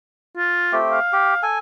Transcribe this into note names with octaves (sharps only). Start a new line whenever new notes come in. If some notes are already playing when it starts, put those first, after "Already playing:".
F4
A3 C4 G4
F5
G4
A4 G#5